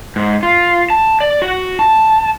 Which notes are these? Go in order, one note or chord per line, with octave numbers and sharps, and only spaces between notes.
G#2
F4
A5
D5
F#4
A5